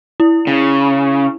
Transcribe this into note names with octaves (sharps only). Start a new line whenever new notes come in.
E4
C#3